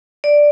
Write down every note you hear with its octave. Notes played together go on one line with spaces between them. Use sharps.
D5